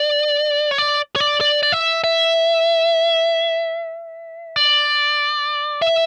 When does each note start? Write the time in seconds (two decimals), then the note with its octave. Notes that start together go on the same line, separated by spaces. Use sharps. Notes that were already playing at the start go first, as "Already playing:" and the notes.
Already playing: D5
0.71 C#5
0.78 D5
1.16 C#5
1.20 D5
1.41 D5
1.63 D5
1.72 E5
2.04 E5
4.56 D5
5.82 E5